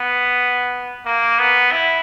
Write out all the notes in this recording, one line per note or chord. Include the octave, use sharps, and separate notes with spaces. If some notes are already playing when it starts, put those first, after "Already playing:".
Already playing: B3
A#3
B3
E4